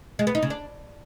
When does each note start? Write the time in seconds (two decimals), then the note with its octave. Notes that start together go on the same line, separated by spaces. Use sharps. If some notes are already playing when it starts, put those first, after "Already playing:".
0.19 G#3
0.27 B3
0.35 D#4
0.43 C#3
0.50 D4